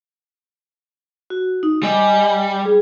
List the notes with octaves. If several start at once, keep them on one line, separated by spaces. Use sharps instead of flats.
F#4
D#4
G3 D#5 G#5
G#4